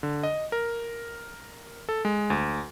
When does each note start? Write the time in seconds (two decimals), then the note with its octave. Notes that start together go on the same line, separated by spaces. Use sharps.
0.03 D3
0.23 D#5
0.52 A#4
1.89 A4
2.05 G#3
2.30 D2